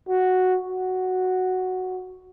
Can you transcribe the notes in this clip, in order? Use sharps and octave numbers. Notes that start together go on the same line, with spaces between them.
F#4
F#4